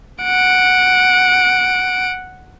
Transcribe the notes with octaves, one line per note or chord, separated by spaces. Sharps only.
F#5 D7